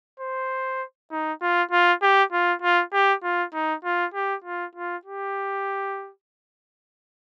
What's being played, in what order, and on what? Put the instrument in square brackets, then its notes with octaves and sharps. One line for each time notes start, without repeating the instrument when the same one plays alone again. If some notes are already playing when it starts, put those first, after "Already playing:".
[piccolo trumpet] C5
D#4
F4
F4
G4
F4
F4
G4
F4
D#4
F4
G4
F4
F4
G4